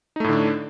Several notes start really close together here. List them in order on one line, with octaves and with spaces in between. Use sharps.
D#4 A3 A2 D3 D4